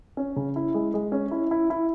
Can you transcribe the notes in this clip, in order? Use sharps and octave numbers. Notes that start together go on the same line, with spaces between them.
C#4
C#3
E4
G#3
G#3
C#4
E4
E4
E4